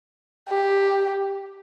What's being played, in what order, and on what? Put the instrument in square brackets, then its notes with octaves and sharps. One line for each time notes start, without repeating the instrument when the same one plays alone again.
[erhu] G4